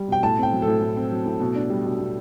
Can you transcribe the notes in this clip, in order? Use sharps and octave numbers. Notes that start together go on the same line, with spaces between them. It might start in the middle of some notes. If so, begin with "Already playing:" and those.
Already playing: G3
B2 G5
A2 A5
C4
G5
F#3
A4
A2
A2
C4
F#3
A2
B2
D4
G3
B2
B2